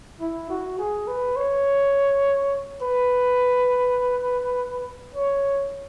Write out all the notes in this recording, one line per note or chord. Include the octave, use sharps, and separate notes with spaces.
E4
F#4
G#4
B4
C#5
B4
C#5